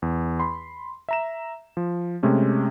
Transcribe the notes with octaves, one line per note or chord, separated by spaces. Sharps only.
E2
B5 C6
E5 A#5 E7
F3
C3 G#3 A3 C#4 G4